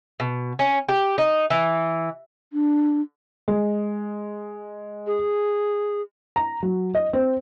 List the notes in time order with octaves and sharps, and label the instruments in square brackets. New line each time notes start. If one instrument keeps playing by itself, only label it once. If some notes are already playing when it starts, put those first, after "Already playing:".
[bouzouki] B2
C#4
G4
D#4
E3
[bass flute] D4
[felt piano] G#3
[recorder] G#4
[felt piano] A#5
F#3
D#5
C4